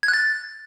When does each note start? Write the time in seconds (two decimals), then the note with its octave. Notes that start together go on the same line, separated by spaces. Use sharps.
0.03 G#6
0.08 F#6
0.14 A6